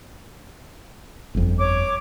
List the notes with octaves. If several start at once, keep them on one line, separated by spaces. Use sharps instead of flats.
G1 F2
C#5 D6